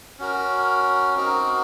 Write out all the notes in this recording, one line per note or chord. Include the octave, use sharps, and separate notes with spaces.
C#4 F#4 A#4
C4 D#4 F#4 A#4